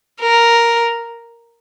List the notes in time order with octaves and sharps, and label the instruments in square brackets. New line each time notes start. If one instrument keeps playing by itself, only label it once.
[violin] A#4